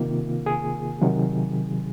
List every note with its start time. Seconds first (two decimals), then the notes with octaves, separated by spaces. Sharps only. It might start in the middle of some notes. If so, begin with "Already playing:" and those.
Already playing: C3 D#3 A#3 F4
0.46 G#4
1.02 C3 D#3 F#3